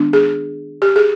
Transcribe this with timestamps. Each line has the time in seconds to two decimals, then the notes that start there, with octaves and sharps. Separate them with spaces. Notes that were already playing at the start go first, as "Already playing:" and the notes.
Already playing: D#3 G#3 B3 D4
0.13 G#4
0.82 G4
0.96 G#4